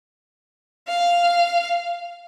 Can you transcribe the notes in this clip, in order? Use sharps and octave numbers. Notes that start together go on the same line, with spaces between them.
F5